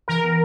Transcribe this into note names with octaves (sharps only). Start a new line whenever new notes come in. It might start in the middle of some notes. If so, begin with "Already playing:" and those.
E3 A#4
B3